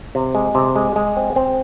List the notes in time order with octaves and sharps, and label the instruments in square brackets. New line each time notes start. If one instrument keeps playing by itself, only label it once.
[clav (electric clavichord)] C3
G#3
C3
G#3
G#3
C4
C4